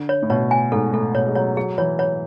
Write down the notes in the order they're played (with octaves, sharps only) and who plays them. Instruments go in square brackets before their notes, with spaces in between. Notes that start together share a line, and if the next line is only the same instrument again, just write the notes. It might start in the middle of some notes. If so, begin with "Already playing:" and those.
Already playing: [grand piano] D3
[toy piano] C#5
[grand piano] A2
[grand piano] B2 [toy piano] C#5
[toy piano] G#5
[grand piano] G#2 [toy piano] A4
[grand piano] A2 [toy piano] A4
[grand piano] B2 [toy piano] C#5
[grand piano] G#3
[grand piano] F#3 [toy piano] C#5
[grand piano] F#3 [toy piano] G#4
[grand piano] E3 [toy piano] C#5
[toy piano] C#5